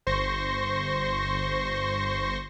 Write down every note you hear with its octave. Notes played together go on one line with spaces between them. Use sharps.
G1 C5 C6 C#6 A#6